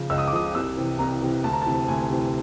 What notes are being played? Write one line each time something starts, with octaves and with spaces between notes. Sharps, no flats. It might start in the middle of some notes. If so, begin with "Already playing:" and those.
Already playing: C#3 F3
C#2 E6
D#6
D6
C#3 F3 D#6
C2 E6
C3 E3
C2 A#5
C3 E3
D2 A5
A#5
C3 E3 A5
D2 G#5
C3 E3